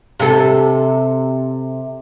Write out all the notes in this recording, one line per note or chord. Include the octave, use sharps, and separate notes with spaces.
C3 A4